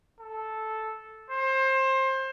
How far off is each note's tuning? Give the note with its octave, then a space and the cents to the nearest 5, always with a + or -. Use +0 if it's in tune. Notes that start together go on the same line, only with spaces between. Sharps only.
A4 -5
C5 +25